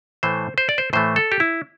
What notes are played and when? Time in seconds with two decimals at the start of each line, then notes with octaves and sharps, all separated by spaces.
0.23 A2 E3 A3 C5
0.58 C5
0.69 D5
0.78 C5
0.93 A2 E3 A3 C5
1.16 A4
1.32 G4
1.40 E4